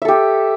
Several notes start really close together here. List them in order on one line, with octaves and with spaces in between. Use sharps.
E5 A4 G4